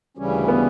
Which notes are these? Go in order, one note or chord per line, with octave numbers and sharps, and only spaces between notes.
D2 C#3 E3 G3 C#4
B3